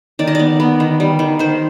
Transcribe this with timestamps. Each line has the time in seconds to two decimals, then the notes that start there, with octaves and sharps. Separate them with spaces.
0.19 D#3 D5
0.27 D#5
0.35 B3 D5
0.60 B3
0.80 D#3
1.00 G3
1.19 D#3
1.39 D#3 C5